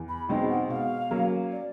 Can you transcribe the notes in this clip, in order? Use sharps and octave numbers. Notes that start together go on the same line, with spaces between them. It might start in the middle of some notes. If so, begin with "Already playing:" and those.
Already playing: E2
B5
B2 G#3 C4 D#4 G5
F#5
B2 F5
F#3 A#3 C#4
D5